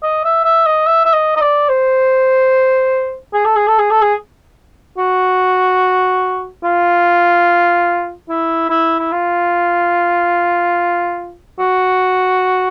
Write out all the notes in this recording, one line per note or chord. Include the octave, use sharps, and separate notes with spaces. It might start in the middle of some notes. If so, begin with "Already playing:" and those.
D#5
E5
E5
D#5
E5
E5
D#5
D#5
D5
C5
G#4
A4
G#4
A4
G#4
A4
G#4
F#4
F4
E4
E4
E4
F4
F#4